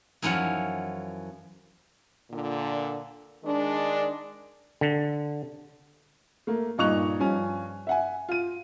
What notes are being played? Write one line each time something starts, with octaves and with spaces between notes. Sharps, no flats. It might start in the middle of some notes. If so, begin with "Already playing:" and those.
F#2 E3 F3 C#4 F#5
A#2 D3
D#3 G#3 D4
D3
A3 A#3
G2 A#2 D#4 C#6 F#6 F7
G2 F3 C#4 G#5
E5 F#5 G#5
F4 D#7